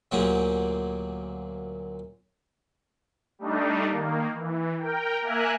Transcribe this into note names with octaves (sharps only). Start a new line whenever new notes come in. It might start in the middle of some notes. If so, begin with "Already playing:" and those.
D2 A#2 F#3 A#3 G4 G#4
G3 A3 D4 D#4
D#3 A#3
E3
A#4 G5
A#3 A#4 E5 G#5 F#6